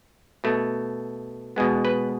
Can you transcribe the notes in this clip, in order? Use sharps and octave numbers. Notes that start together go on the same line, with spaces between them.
B2 A3
B2 G#3 B3
B4